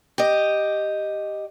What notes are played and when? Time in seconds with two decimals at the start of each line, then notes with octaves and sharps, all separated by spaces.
0.18 G4 D#5